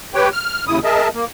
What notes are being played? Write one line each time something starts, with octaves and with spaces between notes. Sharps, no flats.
G4 B4 C#5 G5
F6
D#2 C#3 E4 D#6
G#4 A#4 D#5 E5 A5
A#3